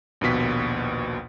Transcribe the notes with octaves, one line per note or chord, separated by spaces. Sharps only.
A#1 D#2 B2 B6